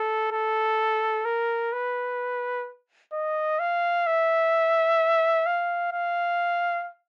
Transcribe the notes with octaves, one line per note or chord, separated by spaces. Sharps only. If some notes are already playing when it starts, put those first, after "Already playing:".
Already playing: A4
A4
A#4
B4
D#5
F5
E5
F5
F5